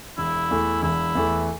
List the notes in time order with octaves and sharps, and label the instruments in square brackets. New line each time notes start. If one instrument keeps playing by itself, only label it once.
[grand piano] E1 [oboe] E4
[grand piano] E2 E3 A3
[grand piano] E1 [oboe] E4
[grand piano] E2 E3 A3